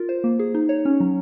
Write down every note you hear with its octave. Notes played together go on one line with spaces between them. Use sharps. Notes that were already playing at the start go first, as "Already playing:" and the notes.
Already playing: F4 A#4
C5
A#3
G#4
D#4
C#5
C#4
F#3